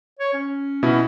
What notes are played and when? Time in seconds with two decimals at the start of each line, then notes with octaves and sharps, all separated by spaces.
0.19 C#5
0.34 C#4
0.83 B2 E4